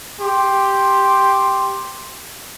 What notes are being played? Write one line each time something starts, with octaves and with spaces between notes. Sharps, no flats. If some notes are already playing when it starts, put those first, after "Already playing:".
G4 C6